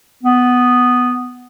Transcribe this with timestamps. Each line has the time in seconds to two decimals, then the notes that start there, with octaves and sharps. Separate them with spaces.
0.23 B3